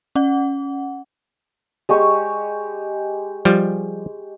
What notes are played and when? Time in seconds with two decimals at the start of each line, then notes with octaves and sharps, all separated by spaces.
0.15 C#4 F#5
1.89 G#3 G4 C#6
3.45 F3 G3